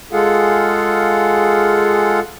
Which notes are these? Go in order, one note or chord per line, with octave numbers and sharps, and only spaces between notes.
G#3 F4 G#4 A4 F5 F#5